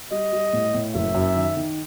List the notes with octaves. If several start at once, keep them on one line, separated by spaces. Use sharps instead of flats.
G3 D#5
G3
A2
A2
F#1 E5
F#2
D#3
D#3